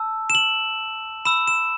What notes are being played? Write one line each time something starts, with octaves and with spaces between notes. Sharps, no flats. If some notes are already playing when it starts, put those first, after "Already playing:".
Already playing: A5 E6
E7
F#7
B5 E6 E7
E7